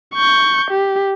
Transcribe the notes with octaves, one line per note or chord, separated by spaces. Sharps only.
C#6 G6
G4